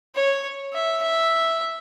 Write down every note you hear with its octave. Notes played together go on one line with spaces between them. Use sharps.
C#5
E5
E5